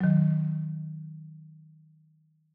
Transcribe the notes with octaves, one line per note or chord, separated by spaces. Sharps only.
D#3 F#3